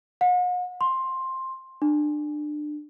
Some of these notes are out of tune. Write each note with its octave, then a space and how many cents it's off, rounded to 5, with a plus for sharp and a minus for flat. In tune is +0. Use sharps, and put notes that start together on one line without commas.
F#5 -45
C6 +10
D4 +25